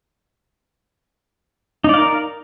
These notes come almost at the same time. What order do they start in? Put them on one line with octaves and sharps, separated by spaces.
D#4 D5 F5 A#4